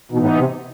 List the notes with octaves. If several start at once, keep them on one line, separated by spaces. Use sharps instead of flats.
B2 E3 B3 D#4
A2
C3